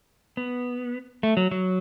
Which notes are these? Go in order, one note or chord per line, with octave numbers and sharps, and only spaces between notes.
B3
A3
F#3
F#3